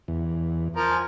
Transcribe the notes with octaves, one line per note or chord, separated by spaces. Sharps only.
E2
F3 A#4
G#5